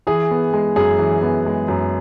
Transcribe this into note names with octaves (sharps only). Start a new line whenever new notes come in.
E3 G#4
B3
G#3
F#2 G#4
E3
B3
G#3
F#2